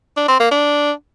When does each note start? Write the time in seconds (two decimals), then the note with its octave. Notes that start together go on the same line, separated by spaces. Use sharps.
0.17 D4
0.28 C4
0.40 A#3
0.51 D4